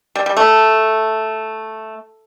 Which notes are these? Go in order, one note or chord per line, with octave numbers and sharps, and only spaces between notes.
G3
G3
A3